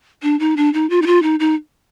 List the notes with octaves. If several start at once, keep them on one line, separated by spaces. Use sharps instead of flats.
D4
D#4
D4
D#4
F4
D#4
F4
D#4
D#4